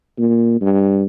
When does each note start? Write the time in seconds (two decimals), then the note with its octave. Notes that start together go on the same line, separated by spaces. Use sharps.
0.18 A#2
0.61 G2